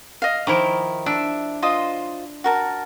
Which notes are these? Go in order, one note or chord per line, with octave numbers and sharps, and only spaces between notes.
D#5 F5
D#3 F3 E4 D6
D4 E5
F4 C5 D#5
F#4 A#4 A5